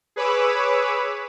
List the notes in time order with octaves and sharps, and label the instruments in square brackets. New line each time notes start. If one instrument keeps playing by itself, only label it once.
[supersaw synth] G#4 B4 C#5 B5 D6 E6